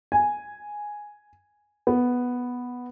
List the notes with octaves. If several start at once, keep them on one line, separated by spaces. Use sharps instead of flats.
G#5
B3